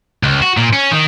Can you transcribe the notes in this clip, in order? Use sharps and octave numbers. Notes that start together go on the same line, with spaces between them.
C#2
F#4
A#2
C#4
D#3